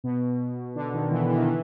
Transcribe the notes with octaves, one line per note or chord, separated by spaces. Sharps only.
B2
D3
D#3
E3
E3
D#3
E3